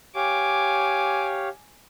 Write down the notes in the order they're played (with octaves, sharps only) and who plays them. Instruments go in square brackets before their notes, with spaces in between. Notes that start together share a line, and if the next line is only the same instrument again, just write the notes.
[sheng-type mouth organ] G4 C#5 F5 [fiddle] G#5 D6